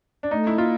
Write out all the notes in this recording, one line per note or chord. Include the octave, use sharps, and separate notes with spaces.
D4
A3 D#4
E4
A#3 F4